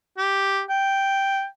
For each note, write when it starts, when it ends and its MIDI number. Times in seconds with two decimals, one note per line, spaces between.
0.18 0.61 67
0.69 1.45 79